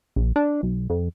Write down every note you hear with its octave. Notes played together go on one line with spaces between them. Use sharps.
A#1
D4
B1
F2